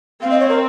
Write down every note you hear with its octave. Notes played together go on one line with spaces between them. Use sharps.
C4 F5
D#5
C#5
A#4